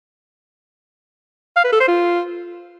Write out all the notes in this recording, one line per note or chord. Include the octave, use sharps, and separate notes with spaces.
F5
B4
A4
C5
F4